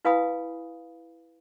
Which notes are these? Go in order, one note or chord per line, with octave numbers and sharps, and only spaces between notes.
E4 B4 F5 G#5 B5 D#6